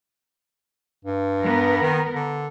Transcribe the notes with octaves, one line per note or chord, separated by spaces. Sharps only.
G2
B3 A#4
D#3
D3